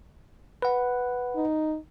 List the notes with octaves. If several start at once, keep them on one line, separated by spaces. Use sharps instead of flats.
B4 F#5
D#4